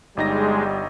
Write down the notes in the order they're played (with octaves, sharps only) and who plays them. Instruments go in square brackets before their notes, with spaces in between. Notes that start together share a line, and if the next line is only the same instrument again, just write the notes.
[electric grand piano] G1 D#4 A#6 [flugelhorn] G3 [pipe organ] G#3